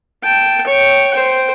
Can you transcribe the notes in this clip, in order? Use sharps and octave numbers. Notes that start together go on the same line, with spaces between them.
G5 A5
C#5 G5
C5 G5